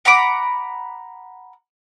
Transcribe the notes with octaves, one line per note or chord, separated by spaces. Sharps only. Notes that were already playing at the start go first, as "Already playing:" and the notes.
F#5 A#5 B5 D6